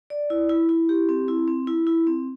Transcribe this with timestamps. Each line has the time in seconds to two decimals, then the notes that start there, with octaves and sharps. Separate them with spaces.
0.10 D5
0.30 E4
0.49 E4
0.69 E4
0.89 G4
1.09 C4
1.28 E4
1.48 C4
1.67 E4
1.87 E4
2.07 C4